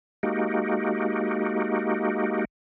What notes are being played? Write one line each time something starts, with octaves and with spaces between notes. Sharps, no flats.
G#3 A#3 D#4 F#4 G4